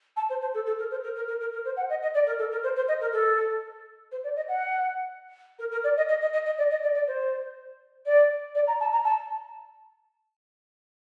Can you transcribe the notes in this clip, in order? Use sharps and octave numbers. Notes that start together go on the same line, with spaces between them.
A5
C5
C5
A4
A4
A#4
C5
A#4
A#4
A#4
A#4
A#4
C5
F#5
D#5
D#5
D5
A#4
A4
A#4
C5
C5
D#5
A#4
A4
C5
D5
D#5
F#5
A#4
A#4
D5
D#5
D#5
D#5
D#5
D#5
D5
D#5
D5
D5
C5
D5
D5
A#5
A5
A#5
A5